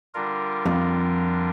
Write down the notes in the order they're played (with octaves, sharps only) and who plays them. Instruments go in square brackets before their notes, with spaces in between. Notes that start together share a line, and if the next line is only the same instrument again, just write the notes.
[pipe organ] D3 G3 D4 F4 A#4
[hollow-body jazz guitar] F2